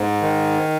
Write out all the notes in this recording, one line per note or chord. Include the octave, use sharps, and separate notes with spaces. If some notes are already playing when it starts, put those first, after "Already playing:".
Already playing: G#2
D#3